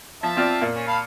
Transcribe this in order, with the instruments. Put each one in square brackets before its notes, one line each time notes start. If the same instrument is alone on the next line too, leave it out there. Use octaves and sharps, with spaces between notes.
[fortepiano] F3 [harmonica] E5 A5
[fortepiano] C4 F4 D5
A#2
[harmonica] C#4
F5 A5 B5